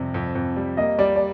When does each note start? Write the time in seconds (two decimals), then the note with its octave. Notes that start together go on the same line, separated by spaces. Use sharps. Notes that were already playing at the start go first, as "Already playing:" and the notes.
Already playing: F2 C3 G3
0.14 F2
0.35 F2
0.56 G3
0.77 A#3 D#5
0.98 G3 D5
1.16 D5